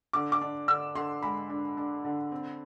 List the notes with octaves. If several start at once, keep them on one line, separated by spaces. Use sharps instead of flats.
D3 D6
D6
D4
D3 E6
D3 C6
G#3 B5
D4
D4
D3
C4